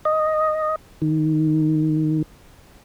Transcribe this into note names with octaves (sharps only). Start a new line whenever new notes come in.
D#5
D#3